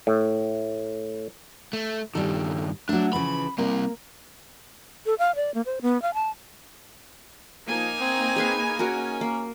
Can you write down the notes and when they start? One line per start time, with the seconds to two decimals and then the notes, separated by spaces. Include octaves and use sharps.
0.07 A2
1.73 A3
2.15 G2 D#3 G3 A4
2.89 F#3 A3 D4
3.13 C#3 E3 F3 B5
3.58 G3 A#3 C4
5.06 A4
5.19 F5
5.35 D5
5.54 A#3
5.66 C5
5.82 B3
6.02 F5
6.14 A5
7.68 F3 A#3 D#4 G#5
8.00 C4
8.36 G#4 B4 F5
8.79 C#4 F#4 A#4
9.21 A#3